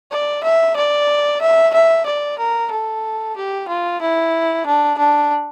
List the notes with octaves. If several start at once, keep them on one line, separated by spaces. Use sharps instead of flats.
D5
E5
D5
E5
E5
D5
A#4
A4
G4
F4
E4
D4
D4